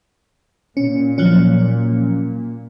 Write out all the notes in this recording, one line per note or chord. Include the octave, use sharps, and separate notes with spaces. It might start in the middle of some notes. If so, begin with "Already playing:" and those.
A#2 C#4
F3 F#3 C#4